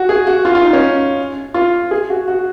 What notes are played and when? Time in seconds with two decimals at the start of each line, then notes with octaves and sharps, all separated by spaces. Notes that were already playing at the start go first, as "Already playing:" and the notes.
Already playing: F#4
0.09 G#4
0.27 F#4
0.45 F4
0.55 F4
0.63 D#4
0.73 C#4
1.54 F4
1.91 G#4
2.10 F#4
2.28 F#4